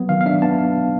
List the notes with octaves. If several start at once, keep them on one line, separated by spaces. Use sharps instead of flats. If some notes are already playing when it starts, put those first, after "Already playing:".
Already playing: F#3 B3
D#3 F5
F5
D4 E5
B3 A5